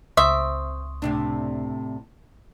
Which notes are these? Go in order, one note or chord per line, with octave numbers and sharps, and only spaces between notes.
C#2 C4 E5 C6 C#6 D#6
A2 C3 D4